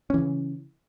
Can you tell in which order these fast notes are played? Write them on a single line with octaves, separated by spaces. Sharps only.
C#4 E3 C#3